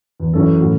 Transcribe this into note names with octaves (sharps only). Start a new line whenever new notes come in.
E2
F#2 E3 C#4 A4
A2